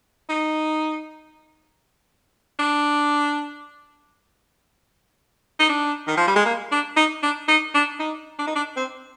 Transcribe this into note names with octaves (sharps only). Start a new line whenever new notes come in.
D#4
D4
D#4
D4
D#3
F3
G3
G#3
A#3
D4
D#4
D4
D#4
D4
D#4
D4
D#4
D4
C4